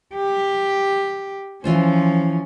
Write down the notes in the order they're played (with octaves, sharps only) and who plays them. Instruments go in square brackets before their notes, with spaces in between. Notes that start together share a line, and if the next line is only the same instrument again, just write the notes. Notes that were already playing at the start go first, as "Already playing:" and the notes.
[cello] G4
[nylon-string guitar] E3 F4 C5 [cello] F3 C#4